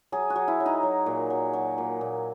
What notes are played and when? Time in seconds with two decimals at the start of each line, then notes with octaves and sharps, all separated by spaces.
0.12 F#3 G#4
0.30 F#4
0.35 F#3
0.48 E4
0.60 F#3
0.66 D#4
0.83 F#3
1.06 A#2
1.30 F#3
1.53 F#3
1.78 A#2
2.01 A#2